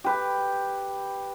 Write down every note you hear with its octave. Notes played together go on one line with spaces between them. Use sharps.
G4 B4